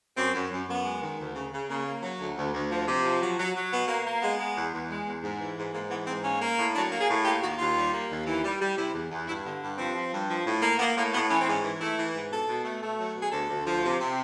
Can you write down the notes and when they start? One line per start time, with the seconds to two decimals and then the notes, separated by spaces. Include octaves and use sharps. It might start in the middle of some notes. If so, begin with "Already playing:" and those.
0.17 F#2 C4
0.34 F#2
0.51 F#2
0.68 F#2 B3
0.84 G#3
1.02 D#3
1.19 D2
1.35 C#3
1.52 C#3
1.69 C#3 A#3
1.85 A#3
2.02 F#3
2.20 D2
2.37 D2
2.53 D2
2.70 F3
2.87 C3
3.04 F3
3.21 F#3
3.38 F#3
3.55 F#3
3.71 B2 B3
3.88 A#3
4.05 A#3
4.21 G#3 B3
4.39 G#3
4.56 E2
4.72 E2
4.89 G#3
5.06 E2
5.23 G#2
5.40 E3
5.57 G#2
5.73 G#2 A#3
5.90 E3 B3
6.07 G#2 C4
6.24 A#3 C#4
6.41 A#3
6.58 A2
6.75 F#3 D4
6.91 A#3
7.00 G#4
7.08 A2
7.25 A#3 G4
7.42 D#2 F#4
7.58 D#2 F4
7.75 G3
7.93 A#3
8.10 D#2
8.27 E3
8.44 G3
8.60 G3
8.77 C3 E4
8.93 E2
9.11 E2
9.27 G2 E4
9.44 D3 B3
9.62 G2
9.78 F3 C4
9.94 F3
10.13 G2
10.29 F3
10.46 A2
10.62 A#3
10.79 A#3 B3
10.96 A2 A#3
11.13 A2 B3
11.29 E3 C#4
11.40 C4
11.47 G#2 C#4
11.64 E3
11.81 A3 E4
11.98 E3
12.14 G#2
12.31 B2 A4
12.48 B2
12.64 A3
12.82 A3
12.99 F#3
13.16 B2
13.22 G#4
13.32 D2 A4
13.49 D2
13.66 F3
13.83 C3
14.00 C3